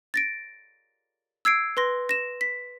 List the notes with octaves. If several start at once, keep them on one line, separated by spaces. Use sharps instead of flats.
A6 A#6 D7
E6 G#6 C7 D7
B4 C6 A#6
A#6 E7
B6